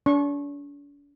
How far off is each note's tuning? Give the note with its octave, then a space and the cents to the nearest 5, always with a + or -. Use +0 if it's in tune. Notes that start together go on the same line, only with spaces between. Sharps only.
D4 -45 C#6 -25